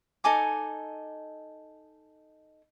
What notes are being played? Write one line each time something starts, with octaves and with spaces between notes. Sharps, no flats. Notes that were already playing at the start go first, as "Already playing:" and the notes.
D#4 A4 G#5 D6